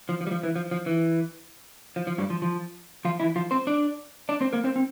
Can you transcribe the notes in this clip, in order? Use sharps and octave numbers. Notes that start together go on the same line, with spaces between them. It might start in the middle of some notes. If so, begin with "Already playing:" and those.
F3
F3
G3
F3
E3
F3
F3
E3
F3
F3
G2 G3
F3
F3
F3 F4
E3 E4
F3 F4
C4 C5
D4 D5
D4 D5
C4 C5
A#3 A#4
C4 C5
C4